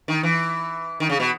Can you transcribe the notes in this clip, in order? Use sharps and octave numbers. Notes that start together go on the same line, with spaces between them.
D#3
E3
D#3
C#3
B2